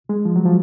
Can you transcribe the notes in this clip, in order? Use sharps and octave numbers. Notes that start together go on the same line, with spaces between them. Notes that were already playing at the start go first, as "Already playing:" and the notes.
G#3
F3
F#3
F3